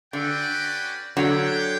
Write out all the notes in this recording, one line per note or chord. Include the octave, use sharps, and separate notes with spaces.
D3 C#4 F#4 B4 D5 G5
D3 F#3 D4 G4 C#5 G5